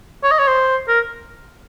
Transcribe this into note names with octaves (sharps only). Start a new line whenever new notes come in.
C#5
D#5
C#5
C5
A#4